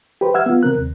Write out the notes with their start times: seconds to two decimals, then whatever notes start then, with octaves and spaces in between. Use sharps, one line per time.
0.21 G4 B4 C5
0.34 E5 F#5 E6 F6 G#6
0.46 B3 F4
0.63 C3 C4 A#4 F#6
0.78 D#2